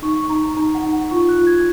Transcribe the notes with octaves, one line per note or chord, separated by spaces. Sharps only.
D#4 C#6
C#6
D#4 A#5
A#5
D#4 A#5
F#5
D#4
F#5
F4 C#6
F#6
F4
G#6